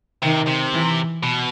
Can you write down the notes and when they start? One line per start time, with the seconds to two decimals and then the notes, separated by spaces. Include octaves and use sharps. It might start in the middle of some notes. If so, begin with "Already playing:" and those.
0.23 C3 D#3
0.48 C3
0.73 E3
1.23 B2